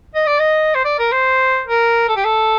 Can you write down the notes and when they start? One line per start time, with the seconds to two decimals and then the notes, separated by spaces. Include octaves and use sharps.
0.15 D#5
0.26 D5
0.39 D#5
0.75 C5
0.85 D5
0.99 A#4
1.12 C5
1.67 A#4
2.08 A4
2.16 G4
2.24 A4